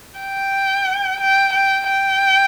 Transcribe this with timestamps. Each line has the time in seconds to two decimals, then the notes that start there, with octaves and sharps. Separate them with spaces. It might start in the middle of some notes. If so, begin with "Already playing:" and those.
0.20 G5
1.21 G5
1.53 G5
1.87 G5